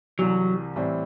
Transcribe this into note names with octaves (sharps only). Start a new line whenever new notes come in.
C2 C3 E3 F#3
A2 E3 G3 C4 E4